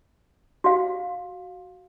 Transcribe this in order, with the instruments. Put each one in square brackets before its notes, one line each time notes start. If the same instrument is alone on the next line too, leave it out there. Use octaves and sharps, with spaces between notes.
[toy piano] F#4 F5